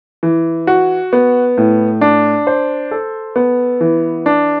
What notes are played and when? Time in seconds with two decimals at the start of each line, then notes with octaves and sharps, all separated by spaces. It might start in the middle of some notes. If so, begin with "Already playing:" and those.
0.23 E3
0.67 F#4
1.13 B3
1.58 A2
2.01 D4
2.47 C5
2.91 A4
3.36 B3
3.81 E3
4.26 D4